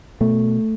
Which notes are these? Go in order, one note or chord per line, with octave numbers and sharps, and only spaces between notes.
B2 A3